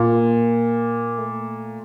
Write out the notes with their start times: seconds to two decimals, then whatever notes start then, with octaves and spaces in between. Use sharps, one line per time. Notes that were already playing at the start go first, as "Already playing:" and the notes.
Already playing: A#2 A#3
1.18 A3